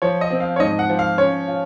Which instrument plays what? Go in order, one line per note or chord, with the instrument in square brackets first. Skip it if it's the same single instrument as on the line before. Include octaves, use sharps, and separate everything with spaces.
[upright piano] F3 [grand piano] C#5
[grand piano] D#5
[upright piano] C4
[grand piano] F5
C#5
[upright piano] G#2 [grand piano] D#5
[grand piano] F#5
[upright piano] F3
[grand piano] F5
[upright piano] C#4 [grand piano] C#5
[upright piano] F4